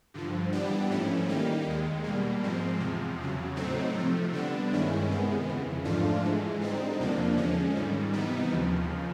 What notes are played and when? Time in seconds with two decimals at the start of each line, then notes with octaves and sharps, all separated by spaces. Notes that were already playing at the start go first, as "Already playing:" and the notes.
0.14 G2 D3 F3
0.52 E3 G3 B3 D4 G4
0.90 G#2 F3 A3 C#4 E4
1.28 D#3 G3 A#3 D#4 G4
1.66 D#2 D#3 G#3
2.04 B2 G3 A#3
2.42 G#2 F3 G#3 C4
2.80 E2 C3 F3
3.19 E2 C#3 F#3
3.56 A2 F#3 A3 C4 D#4
3.95 C3 F3 A3
4.33 D3 G3 B3 D4
4.71 G2 D#3 G#3 C#4 E4
5.08 C3 D#3 G#3 B3
5.47 F2 C#3 E3
5.85 G#2 F3 A3 D4 F4
6.23 G#2 E3 G#3
6.61 D3 G3 C4 D#4
7.00 E2 C3 F3 A#3 D4
7.37 D3 F3 G#3 C#4
7.75 G#2 D#3 G3
8.13 C3 E3 G3 B3 D#4
8.51 D#2 C#3 F3